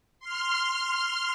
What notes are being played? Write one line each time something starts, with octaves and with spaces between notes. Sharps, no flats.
C6 F6